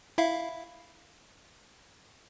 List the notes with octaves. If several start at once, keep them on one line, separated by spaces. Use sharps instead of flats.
E4 E5 F5